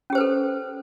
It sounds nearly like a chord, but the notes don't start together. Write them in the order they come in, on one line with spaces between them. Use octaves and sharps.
C#4 G4 C5 B4 A4